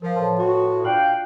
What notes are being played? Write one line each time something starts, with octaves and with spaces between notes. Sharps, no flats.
F3 A#4 F5
A2 B4 A5 C6
F#4
D4 F4 F5 G5 F#6 F#7